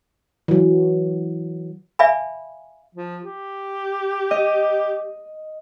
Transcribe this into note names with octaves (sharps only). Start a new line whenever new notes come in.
E3 F#3
D5 E5 F5 G#5 B5
F3
G4
D#5